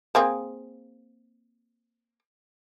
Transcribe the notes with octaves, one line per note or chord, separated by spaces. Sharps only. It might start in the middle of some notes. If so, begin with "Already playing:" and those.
A#3 C4 G#4